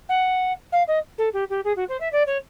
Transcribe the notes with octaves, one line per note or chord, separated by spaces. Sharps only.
F#5
F5
D#5
A4
G4
G4
G#4
F#4
C5
E5
D5
C#5